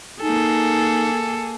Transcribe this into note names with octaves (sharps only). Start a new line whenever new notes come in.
A#3 D#4 G#4 A4